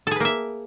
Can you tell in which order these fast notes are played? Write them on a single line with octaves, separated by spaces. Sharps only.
A4 G#4 B4 A#3 E5